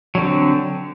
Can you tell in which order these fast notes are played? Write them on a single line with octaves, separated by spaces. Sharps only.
F#3 D3 C4